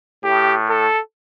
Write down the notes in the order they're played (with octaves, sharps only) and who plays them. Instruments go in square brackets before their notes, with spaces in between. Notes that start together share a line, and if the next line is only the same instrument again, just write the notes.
[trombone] A2 [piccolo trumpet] G4
[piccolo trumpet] A4